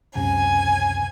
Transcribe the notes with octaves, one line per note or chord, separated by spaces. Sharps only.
C#2 F#2 C3 G#5